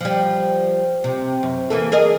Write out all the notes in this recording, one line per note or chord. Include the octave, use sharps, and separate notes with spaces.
F3 G3
C3
F#2
E3 A#3 A4
G#4 A#4 D#5